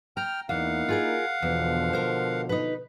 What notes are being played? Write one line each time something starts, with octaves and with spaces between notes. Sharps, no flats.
G5 A#5 F6
E2 A#3 D#4 E4 F5 F#5
F4 G#4 A#4
E2 B2 D3 F3
A#4 C5
D#4 B4